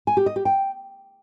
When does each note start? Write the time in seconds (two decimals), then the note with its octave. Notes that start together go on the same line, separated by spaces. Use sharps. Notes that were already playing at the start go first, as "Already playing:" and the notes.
0.07 G#5
0.17 G4
0.26 D#5
0.36 G4
0.45 G5